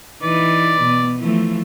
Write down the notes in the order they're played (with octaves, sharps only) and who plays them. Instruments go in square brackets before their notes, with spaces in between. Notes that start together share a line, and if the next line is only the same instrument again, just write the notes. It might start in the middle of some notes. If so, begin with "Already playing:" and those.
[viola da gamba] E3 D#4 B4 [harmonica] D5
[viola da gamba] B2 B3
E3 F3 A3